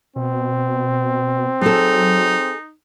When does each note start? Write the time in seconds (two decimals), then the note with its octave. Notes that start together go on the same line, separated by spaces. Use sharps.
0.16 B2 C4
1.61 F#3 D#4 G#4 A4